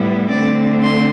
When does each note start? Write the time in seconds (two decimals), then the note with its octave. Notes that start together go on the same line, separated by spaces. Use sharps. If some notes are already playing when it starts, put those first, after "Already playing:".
Already playing: A2 G3 B3 E4
0.29 D3 A3 C4 D5
0.82 C6